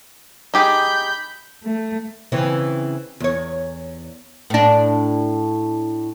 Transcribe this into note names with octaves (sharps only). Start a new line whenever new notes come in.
D#4 G4 G#4 B5 G6
A3
C#3 E3 C4
E2 C#5
A2 D4